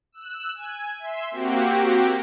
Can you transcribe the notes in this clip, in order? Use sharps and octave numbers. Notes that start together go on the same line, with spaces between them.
E6 F#6
G#5
E5 C6
A#3 C4 F#4 G4